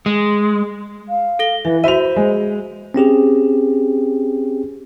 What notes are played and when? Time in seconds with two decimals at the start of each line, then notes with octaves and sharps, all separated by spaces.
0.06 G#3
1.09 F5
1.39 A4 A#6 G7
1.65 E3 B4 E5
1.84 F#4 C5 E5 B5 D#7 F7
2.16 G#3
2.94 C4 C#4 G4 G#4